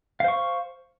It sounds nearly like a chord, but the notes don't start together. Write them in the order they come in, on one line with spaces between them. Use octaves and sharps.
F5 C5 C#6